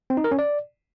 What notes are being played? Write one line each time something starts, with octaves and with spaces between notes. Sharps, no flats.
C4
D#4
A#4
C#4
D5